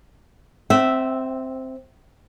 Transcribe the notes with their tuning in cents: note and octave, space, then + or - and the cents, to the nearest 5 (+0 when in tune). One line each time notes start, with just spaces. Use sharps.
C4 +0 E5 -5 G5 -45